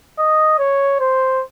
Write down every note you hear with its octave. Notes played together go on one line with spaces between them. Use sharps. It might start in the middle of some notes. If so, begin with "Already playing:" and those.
D#5
C#5
C5